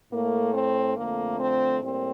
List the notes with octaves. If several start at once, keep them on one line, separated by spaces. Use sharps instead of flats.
A2 A3 A#3
C4
F2 D3 A3 A#3
C4
A2 G3 A#3 C4